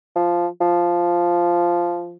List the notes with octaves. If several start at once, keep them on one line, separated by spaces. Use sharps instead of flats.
F3
F3